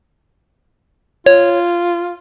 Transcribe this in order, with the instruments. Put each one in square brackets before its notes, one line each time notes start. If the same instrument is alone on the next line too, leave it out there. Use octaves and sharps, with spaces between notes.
[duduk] F4 [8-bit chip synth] C#5